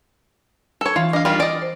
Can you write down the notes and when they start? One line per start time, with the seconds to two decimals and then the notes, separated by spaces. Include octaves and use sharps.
0.81 A4 C#5
0.96 E3 F4 F5
1.13 D4 D#5 F5
1.25 D#3 G3 F4
1.40 D5 D#5
1.62 C5